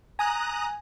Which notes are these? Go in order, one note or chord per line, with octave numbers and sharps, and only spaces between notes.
G#5 A#5 D#6 F#6